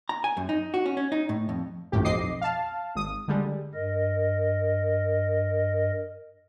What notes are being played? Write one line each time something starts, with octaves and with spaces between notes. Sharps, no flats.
A#5
G#5
F#2
D#4
F#4
C#4
C#4
D#4
A2
F2
G#1 F#2 A2 G4
B1 F2 D#5 D6 C7
F5 A5
G#1 D#6
D3 G3 G#3
G2 A#4 D#5